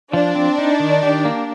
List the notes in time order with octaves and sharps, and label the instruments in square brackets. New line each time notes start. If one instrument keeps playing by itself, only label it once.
[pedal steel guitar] F3 [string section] D4
[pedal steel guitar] C4
D#4
D#3
G4
A#3